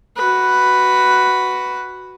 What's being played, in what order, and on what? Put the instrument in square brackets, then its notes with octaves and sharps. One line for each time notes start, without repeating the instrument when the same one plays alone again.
[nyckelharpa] F#4 B4